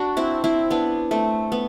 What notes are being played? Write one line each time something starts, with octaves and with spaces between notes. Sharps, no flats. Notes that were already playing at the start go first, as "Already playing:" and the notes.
Already playing: D4 F#4
C4 E4
C4 E4
B3 D4
A3 C4
B3